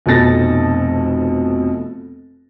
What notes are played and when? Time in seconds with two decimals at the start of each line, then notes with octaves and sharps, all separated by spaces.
0.06 F1 F2 B2 A4 A6 A#6